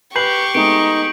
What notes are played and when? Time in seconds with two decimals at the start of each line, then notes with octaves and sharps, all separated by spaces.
0.16 G4 B4 C#6 F#6 G6 C7 F#7
0.54 G#3 A3 B3 D#4 D7